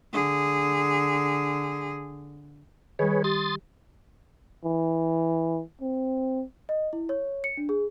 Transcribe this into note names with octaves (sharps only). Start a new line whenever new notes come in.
D3 G#4
D#3 G3 G#4 B4 C#5
G4 C6 D#6 A6
E3
C4
D#5
E4
C#5
C#7
D4
G#4